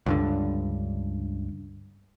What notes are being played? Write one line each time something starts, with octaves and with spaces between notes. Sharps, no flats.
C#2 G2 D3